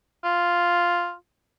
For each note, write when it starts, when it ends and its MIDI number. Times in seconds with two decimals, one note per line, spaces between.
0.24 1.14 65